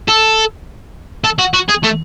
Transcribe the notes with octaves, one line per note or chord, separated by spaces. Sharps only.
A4
A4
F#4
F#4
G#4
A3